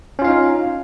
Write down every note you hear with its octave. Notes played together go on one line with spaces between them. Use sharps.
C#4 D#4 F4 F5